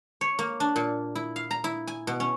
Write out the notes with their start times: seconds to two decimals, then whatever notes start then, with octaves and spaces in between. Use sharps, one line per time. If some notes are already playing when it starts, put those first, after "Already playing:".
0.21 C#5
0.39 A#3
0.60 D4
0.76 A#2
1.15 E4
1.36 F5
1.51 A#5
1.64 E4
1.87 G#5
2.07 B2
2.20 C#4